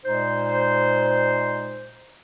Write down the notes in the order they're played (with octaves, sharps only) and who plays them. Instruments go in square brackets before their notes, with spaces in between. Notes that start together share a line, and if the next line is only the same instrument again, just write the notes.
[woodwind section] A#2 G#3 D#4 C5